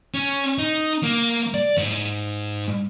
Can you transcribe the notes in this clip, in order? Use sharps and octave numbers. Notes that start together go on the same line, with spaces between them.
C#4
D#4
A#3
D5
G#2